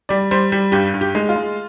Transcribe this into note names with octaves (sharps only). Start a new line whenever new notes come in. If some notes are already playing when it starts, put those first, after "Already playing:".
G3 D5
G3 C5
G3
G2 G4
G2
G4
G#3
F4
G#3